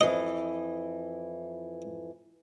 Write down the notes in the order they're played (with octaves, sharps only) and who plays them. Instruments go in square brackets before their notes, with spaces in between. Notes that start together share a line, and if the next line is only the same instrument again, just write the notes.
[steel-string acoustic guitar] F2 E3 [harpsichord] D#5